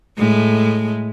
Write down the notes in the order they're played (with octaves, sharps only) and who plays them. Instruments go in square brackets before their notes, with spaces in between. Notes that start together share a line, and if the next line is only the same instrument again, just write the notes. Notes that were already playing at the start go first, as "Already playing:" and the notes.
[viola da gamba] A2 G#3 A3